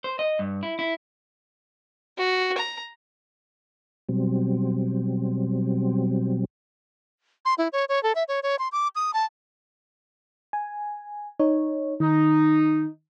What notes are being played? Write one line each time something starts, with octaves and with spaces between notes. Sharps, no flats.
C5
D#5
G2
E4
E4
F#4
A#5
B2 F#3 G3 C4
C6
E4
C#5
C#5
A4
E5
C#5
C#5
C6
D6
D#6
A5
G#5
D#4 C#5
D#3 D#4